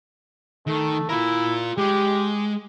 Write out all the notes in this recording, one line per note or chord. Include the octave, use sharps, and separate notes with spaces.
D#3 A3
E4 F4 A#4
G#3 G4